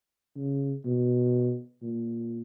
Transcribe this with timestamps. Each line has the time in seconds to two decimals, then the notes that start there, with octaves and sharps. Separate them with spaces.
0.36 C#3
0.85 B2
1.83 A#2